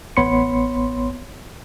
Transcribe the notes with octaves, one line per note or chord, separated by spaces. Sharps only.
A1 B3 C#5 B5 C6 C#7